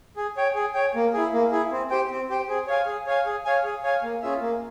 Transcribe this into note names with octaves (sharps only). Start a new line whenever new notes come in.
G#4
C#5 G5
G#4
C#5 G5
A#3
E4 G#4
A#3
E4 G#4
C4
G4 C5 G5
C4
G4 C5 G5
G#4
C#5 F5 G#5
G#4
C#5 F5 G#5
G#4
C#5 F5 G#5
G#4
C#5 F5 G#5
A#3
C#4 F4 G#4 E5
A#3